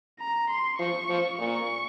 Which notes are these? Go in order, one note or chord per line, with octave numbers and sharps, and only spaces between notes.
A#5
C6
F3 C#6
F3
A#2 C#6